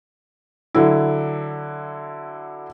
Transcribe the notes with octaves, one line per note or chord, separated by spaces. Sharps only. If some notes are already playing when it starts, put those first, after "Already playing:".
D3 F#3 E4